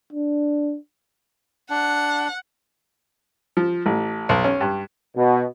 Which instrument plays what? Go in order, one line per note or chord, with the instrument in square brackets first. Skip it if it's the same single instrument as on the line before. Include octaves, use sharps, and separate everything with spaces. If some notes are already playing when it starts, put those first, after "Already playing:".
[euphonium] D4
[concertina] D4 [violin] F#5
[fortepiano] F3
A1
B1
C#4
G2
[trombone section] B2